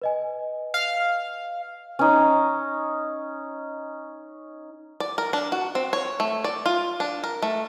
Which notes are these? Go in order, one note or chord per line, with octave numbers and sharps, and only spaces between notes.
B4 D#5 G#5
F5
C#4 D#4
D5
A#4
D4
F#4
C4
C#5
A3
D5
F4
D4
A#4
A3